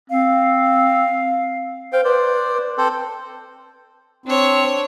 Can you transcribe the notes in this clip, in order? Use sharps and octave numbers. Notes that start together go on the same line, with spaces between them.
C4 F5
C5 F5 G5
B4 C5 D5
C4 A4 C5
C4 D4 C#5